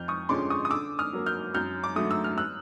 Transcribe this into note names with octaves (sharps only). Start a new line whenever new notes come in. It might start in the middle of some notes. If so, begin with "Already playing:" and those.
Already playing: F2 F6 G6
C#6 D#6
D3 F3 G#3 C#4 C6 D6
C#6 D#6
D#6
D3 D6 E6
D#6 F6
F#3 A#3
F6 G6
F#2 F6 G6
D6
D3 F#3 A3 D#6
E6
F6
E6 F#6